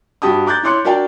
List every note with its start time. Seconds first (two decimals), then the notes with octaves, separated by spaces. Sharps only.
0.22 G2 F#4 G4 A5 D#6
0.46 A#5 D6 F#6 G6 A6
0.63 E4 C#5 C6 D6 F#6 C#7
0.85 D4 F#4 A#4 D5 F5 G5